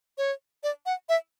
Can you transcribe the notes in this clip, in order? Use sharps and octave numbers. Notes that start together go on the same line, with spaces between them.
C#5
D5
F#5
E5